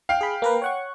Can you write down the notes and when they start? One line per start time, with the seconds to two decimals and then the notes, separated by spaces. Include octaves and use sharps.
0.09 F5 G5
0.21 G#4 B5
0.42 A#3 A#4 B4
0.62 C#5 F#5 C#6